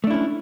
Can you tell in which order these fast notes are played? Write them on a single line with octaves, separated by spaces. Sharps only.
A3 D4 E4 C#4